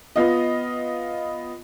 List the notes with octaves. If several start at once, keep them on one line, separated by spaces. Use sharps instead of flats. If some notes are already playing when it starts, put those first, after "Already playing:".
B3 F4 D#5